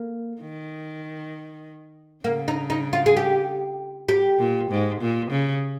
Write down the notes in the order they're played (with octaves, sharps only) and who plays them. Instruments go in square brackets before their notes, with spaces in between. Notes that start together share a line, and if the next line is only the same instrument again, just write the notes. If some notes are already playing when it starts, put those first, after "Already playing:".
Already playing: [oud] A#3
[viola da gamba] D#3
[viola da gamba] C#3 [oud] A#3
[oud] D#4
D#4
F4
G#4
G4
G4
[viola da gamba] A#2
G#2
A#2
C#3